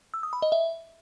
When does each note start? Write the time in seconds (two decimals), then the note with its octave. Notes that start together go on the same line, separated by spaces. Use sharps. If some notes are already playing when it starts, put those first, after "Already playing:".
0.14 E6
0.23 D#6
0.33 B5
0.42 D#5
0.52 E5